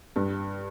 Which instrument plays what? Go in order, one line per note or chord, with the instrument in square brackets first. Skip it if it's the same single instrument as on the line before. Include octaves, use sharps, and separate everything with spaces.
[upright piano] G2